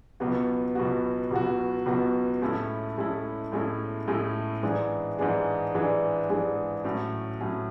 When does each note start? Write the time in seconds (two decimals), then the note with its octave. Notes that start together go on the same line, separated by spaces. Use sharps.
0.20 C#2 B2 F#3 B3 F#4
0.75 C#2 B2 F#3 B3 F#4
1.31 C#2 B2 F#3 B3 F#4
1.86 C#2 B2 F#3 B3 F#4
2.42 A2 G#3 C#4 E4 A4
2.97 A2 G#3 C#4 E4 A4
3.52 A2 G#3 C#4 E4 A4
4.08 A2 G#3 C#4 E4 A4
4.63 G#2 E3 G#3 D4 G#4
5.19 G#2 E3 G#3 D4 G#4
5.74 G#2 E3 G#3 D4 G#4
6.30 G#2 E3 G#3 D4 G#4
6.84 A2 F#3 C#4
7.41 A2 F#3 C#4